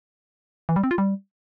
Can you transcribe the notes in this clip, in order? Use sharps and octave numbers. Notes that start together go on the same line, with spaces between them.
E3
G3
C4
F4
G3